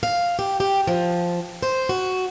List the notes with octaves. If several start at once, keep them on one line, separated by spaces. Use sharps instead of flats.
F5
G4
G4
F3
C5
F#4